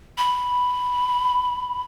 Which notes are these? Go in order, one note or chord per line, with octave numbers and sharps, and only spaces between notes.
B5